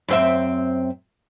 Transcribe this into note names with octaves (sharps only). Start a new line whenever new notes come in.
F#2 C4 E5